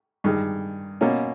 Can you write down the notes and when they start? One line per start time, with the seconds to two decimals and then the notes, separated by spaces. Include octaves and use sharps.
0.24 G2 D#3 G#3
1.01 B2 A#3 C#4